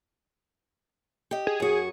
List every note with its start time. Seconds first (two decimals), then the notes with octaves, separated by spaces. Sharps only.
1.31 G4 D#5
1.47 G#4
1.60 F#2 F#4